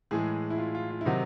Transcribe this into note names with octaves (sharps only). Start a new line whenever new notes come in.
A2 E3 G#3 G#4
E4
F4
F4
F4
E4
C3 D#3 F#3 D#4